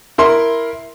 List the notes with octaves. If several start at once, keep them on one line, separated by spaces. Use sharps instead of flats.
E4 A#4 C6